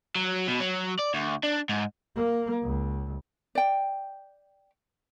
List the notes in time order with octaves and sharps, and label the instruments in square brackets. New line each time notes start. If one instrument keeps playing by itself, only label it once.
[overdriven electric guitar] F#3
B2
F#3
D5
D2
D4
G#2
[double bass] A#3
C#2
[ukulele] D5 G5